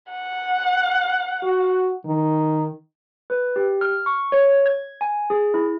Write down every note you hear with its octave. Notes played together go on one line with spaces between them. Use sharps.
F#5
F#4
D#3
B4
G4
F6
C#6
C#5
G#6
G#5
G#4
E4